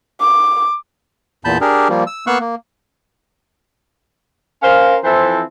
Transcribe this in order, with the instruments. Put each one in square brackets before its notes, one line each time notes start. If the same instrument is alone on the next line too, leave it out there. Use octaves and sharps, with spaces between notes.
[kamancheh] D6
[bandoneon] E2 A#2 A5 B5 G6
D4 G4 G#4 A#4
F3 G3 A#3
E6
A#3 B3 F5 C#6 E6 F#6
A#3
[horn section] C#4 A#4 C5 F5
E3 F3 C4 E4 A4 C5